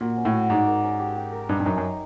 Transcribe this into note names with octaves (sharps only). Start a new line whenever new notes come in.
A#2 F#4
C#4
A2
F#4
G#2 D5
A#4
C#4
G4
G4
A#4
G2 D#4
G2
F#2 D#4
F#2
D#4